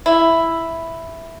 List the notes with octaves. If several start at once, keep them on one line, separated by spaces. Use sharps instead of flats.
E4